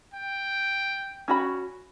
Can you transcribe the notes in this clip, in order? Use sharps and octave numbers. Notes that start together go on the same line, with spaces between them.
G5
C#4 F#4 B5